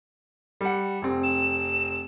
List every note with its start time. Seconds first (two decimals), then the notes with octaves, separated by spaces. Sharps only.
0.61 G3 F#5
1.02 F1 C4
1.23 E7